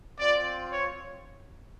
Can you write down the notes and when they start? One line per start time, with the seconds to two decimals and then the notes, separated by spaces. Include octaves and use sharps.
0.18 C4 F4 D5
0.70 C#5